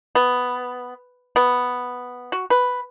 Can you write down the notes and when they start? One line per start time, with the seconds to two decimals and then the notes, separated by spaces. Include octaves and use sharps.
0.15 B3
1.36 B3
2.32 F#4
2.50 B4